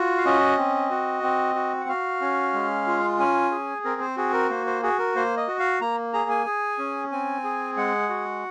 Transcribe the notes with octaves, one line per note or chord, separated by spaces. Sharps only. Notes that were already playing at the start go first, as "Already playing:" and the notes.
Already playing: F4 F#4
F5
C#4 D#5
C4
F#4
C4
F#4
F#5
F#4 F5
C#4
G#3
F4
C#4 G#5
G#4
C4 A#4
C5
F#4 G#4
A#4
A#3 C5
C5
F#4 G#4
A#4
A#3 C5
D#5
F#4
F5
A#3 A#5
G#4 A#5
G#5
G#4
C#4
C4 G#5
G#4
G#3 F#5
F#4